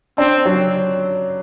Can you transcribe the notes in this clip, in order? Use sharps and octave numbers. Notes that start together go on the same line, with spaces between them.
C4 D4
F#3